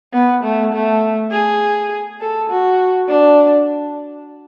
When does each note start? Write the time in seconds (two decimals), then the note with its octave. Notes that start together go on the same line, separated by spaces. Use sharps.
0.13 B3
0.44 A3
0.73 A3
1.31 G#4
2.21 A4
2.50 F#4
3.08 D4